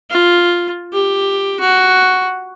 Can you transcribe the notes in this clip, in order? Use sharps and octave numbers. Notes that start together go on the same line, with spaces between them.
F4
G4
F#4